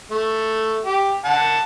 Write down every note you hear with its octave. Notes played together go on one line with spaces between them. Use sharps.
A3
G4
F#5 A5